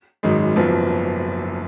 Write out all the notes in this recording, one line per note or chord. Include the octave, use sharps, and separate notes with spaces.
G#1 F#2 D#3 G#3
F#1 F#2 F3 B3